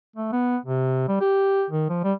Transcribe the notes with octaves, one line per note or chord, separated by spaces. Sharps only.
A3
B3
C3
G3
G4
D#3
F3
G3